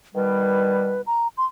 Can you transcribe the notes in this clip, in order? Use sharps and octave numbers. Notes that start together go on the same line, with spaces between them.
B2 D#3 G3 B4
A#5
C6